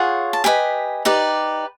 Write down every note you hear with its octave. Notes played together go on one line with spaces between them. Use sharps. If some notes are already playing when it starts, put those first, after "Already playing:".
Already playing: F4 G#4 C#5 F#5
A5
G4 B4 D#5 G#5
D#4 G4 B4 D5